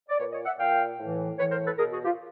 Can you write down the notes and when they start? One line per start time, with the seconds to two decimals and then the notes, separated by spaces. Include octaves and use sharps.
0.09 D5
0.18 A#2 B4 C#5
0.32 C#5 D#5
0.45 E5 F#5
0.59 A#2 F5 G5
0.99 A2 E3
1.38 A2 B4 C#5
1.42 E3
1.51 A#4 C5
1.65 A4 B4
1.78 B2 G#4 A#4
1.92 F#4 G#4
2.05 F4 G4